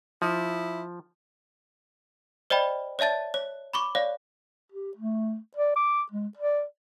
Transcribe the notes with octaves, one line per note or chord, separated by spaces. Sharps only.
F3 E4
C5 D5 D#5 G5 B5
C#5 D5 E5 A5 A6
C#5
B5 C#6 D6
C#5 D5 F5
G4
A3
D5
D6
G#3
D5